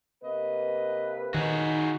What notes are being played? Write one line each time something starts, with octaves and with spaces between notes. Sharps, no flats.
C3 A#3 B4 D#5
D#3 D#4 F#4 G#4 D#5